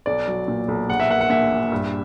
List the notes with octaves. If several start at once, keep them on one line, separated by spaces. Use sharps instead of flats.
B1 D5
F#3
A#2
B1
A#1 F#5
E5
A#3 F#5
F#5
A#2 E5
A#1
G2